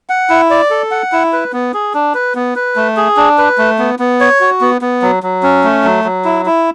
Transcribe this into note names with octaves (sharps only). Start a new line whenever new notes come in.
F#5
E4
D5
A4
F#5
E4
B4
B3
G#4
D4
B4
B3
B4
A3
G#4
D4
B4
A3
B3
B3
C#5
F#4
B3
B3
F#3
F#3
C#4
A3
F#3
F#3
E4
E4